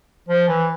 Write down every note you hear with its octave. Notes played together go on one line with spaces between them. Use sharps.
F3
E3